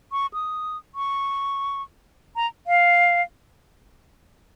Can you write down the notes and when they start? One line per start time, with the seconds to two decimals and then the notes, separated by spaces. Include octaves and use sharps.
0.12 C#6
0.33 D#6
0.95 C#6
2.36 A#5
2.67 F5